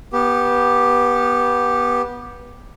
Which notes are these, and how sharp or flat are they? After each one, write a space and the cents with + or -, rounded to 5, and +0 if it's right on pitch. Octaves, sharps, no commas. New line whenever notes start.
B3 -20 G4 +0